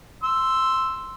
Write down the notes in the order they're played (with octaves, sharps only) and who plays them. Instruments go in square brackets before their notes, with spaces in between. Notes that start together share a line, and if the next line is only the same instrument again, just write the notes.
[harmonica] C6 E6